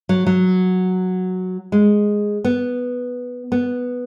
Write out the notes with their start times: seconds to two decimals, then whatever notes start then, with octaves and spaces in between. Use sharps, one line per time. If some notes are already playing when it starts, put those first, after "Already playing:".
0.09 F#3
0.27 F#3
1.72 G#3
2.44 B3
3.52 B3